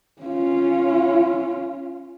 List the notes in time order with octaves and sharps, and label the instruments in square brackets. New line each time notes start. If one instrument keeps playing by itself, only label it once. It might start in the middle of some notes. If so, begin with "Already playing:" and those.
[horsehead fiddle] C#4 F4